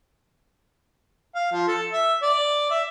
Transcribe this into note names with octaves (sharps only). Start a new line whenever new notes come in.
F5
F3
A4
E5
D5
E5